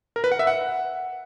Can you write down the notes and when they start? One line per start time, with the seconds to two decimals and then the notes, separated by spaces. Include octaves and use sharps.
0.16 A#4
0.24 B4
0.32 F#5
0.39 E5
0.47 F#5